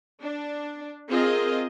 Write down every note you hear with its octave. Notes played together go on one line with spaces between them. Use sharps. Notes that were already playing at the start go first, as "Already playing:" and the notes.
D4
C4 F4 G#4 A#4 D#5